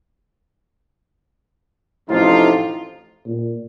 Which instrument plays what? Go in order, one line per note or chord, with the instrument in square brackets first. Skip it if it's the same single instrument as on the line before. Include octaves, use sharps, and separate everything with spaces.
[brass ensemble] A1 A2 C3 F3 D#4 F4
[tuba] A#2